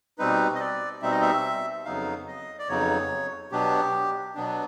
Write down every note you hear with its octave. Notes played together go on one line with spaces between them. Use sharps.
B2 G3 C4 D#4 B4
D#5
D5
B2 G3 C4 D#4 E5
D#5
E5
F2 C#3 F#3 B3 D#4 F5
D#5
D5
F2 C#3 F#3 B3 D#4 C#5
B2 F#3 B3 D4 G4
B2 F#3 B3 D4